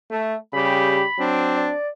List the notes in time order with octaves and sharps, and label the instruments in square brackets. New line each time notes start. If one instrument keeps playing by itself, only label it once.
[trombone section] A3
[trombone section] C#3 G3 G4 [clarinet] B5
[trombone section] F#3 C4 D4
[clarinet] D5